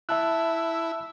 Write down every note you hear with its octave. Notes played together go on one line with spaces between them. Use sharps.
E4 E5 A5 F#6